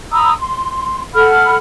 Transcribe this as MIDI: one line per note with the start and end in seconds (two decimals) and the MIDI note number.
0.12 0.34 82
0.12 0.34 83
0.12 0.34 87
0.12 0.34 88
0.39 1.04 84
1.14 1.58 69
1.14 1.58 78
1.14 1.58 83
1.14 1.58 89